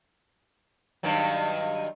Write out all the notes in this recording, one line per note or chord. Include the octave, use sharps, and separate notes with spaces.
G2 D#3 F#3